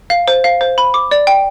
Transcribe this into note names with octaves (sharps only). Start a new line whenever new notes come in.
F5
C5
F5
C5
B5
D6
D5
G5